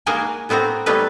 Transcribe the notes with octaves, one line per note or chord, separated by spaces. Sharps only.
G#3 A#3 D#4 F#4 A#4 B4
A2 B3 C4 F#4 A#5
F#3 G3 A3 B3 D#4 B4